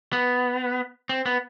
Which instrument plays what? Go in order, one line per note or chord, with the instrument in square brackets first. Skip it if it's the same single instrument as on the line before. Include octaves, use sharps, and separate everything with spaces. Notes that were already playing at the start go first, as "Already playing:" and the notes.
[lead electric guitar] B3
C4
B3